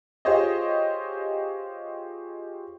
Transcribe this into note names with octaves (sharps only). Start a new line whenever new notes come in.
F4 G4 G#4 C5 C#5 D#5